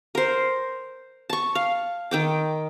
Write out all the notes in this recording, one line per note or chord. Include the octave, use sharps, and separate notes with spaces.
A#4 C5
A5 C#6
F5
D#3 G5 D6